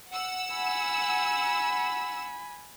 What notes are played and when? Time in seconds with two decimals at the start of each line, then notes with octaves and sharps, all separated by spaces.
0.10 F#5 E6
0.54 G#5 B5